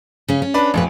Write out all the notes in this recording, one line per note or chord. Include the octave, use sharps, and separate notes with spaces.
C#3 C#4
C#4
D4 B4
A1 F2 A#2 B4